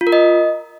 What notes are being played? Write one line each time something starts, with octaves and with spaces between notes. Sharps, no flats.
F4
A#4
D#5